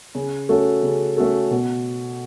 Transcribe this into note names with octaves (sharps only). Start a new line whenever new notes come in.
C#3
A3 C#4 F#4 A4
C#3
A3 C#4 F#4 A4
B2